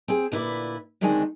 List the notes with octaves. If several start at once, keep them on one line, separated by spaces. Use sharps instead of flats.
C4 G#4
D2 A#2 E4 B4 D5
D2 D#3 G#3 C4 D4 G#5